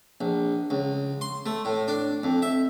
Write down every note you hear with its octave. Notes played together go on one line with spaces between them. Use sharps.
A#1
C#2
C6
A3
A2
D4
F2
E5